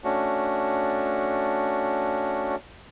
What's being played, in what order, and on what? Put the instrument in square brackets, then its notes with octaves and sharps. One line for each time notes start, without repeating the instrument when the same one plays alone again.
[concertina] A3 C#4 D4 F#4